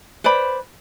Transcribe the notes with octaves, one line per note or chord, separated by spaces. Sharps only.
B4 C5 D5 B5